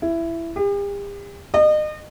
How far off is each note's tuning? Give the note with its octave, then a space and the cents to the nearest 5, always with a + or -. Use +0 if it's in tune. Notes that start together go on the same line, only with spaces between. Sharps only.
E4 +15
G4 +45
D#5 -35